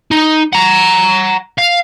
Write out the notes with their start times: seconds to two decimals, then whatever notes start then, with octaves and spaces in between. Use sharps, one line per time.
0.11 D#4
0.53 F#5 A#5
1.59 F5